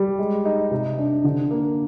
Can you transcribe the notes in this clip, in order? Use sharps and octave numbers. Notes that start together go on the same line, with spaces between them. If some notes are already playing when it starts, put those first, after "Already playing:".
Already playing: G3
G#3
D#4
C3
D4
D3
A#3